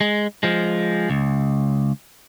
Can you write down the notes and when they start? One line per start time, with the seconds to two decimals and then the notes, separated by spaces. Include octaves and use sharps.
0.01 G#3
0.43 F3 G#3
1.10 C#2